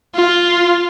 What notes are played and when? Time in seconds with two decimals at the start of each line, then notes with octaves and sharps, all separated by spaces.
0.15 F4